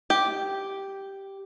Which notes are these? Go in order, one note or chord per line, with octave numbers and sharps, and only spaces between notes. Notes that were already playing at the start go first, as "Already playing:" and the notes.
G4